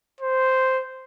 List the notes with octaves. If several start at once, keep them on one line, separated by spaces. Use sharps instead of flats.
C5